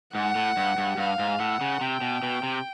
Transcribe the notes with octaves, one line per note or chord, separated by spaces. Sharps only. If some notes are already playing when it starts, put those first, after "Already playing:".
G#2 F#5
A2
G2
G2
G2 F5
G#2
A2 F#5
C#3
C3 G5
B2
B2
C3